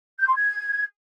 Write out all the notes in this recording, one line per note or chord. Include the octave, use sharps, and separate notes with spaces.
G6
C6
G#6